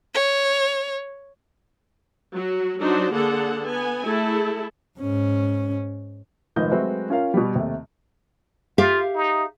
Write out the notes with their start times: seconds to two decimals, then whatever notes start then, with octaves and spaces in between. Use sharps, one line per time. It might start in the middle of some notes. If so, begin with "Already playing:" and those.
0.14 C#5
2.33 F#3 F#4
2.79 F#3 D4 D#4 F#4 C5
3.12 D3 A#3 G#4 A4 F#5
3.65 B3 G#5
4.04 A3 E4 G#4 A4
4.99 G#2 C#4
6.56 F1 G#2 D#3 F4 D#5 G6
6.71 F#3 G#3 A3 C4 F#4 B4
7.10 C#4 F4 A#4 F5
7.34 B2 G3
7.55 D#2 C3 A3
8.78 F4 G4 E5 F5
9.15 D#4